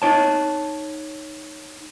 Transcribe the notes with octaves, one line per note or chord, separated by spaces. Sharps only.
D#4 C#5 A5